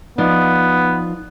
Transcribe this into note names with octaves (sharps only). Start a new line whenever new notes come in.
F3 B3 D#4 D5